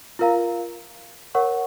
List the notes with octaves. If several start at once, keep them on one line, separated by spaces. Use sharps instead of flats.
F4 A#4 F5 A#5
A#4 C#5 F#5 C#6